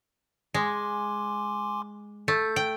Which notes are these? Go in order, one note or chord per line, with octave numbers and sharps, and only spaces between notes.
G#3 G#5 C6 D6
A3 G6
G5